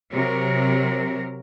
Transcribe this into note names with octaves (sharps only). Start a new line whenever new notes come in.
C3 F#3 A#4